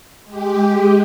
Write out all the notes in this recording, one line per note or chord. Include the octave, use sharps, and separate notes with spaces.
G#3 G4